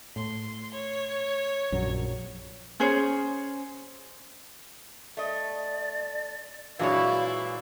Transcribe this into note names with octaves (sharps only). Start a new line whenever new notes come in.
A2 C6
C#5
A#1 F#2 F#3
C#4 G#4 C5 C#5
A3 D5 D#5
A#2 E3 F#3 G#3 D4 E4 C#5 F5